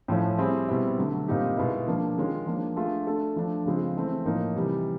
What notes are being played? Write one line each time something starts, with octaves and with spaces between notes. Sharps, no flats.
A2 F3 A3 C#4
G3 C4 E4 G#4
B2 G3 C4 E4
D3 F#3 A3
A#2 G3 C4 D#4 G4
B2 G#3 B3 E4
F3 A#3 D4
D#3 G#3 C#4 F4
F3 A#3 D4
A3 D4 F4 G#4
A3 D4 F#4 A4
F3 A3 D4
C#3 F3 G#3 C4 F4
E3 A3 C4
A2 F3 A#3 D#4
C3 E3 G3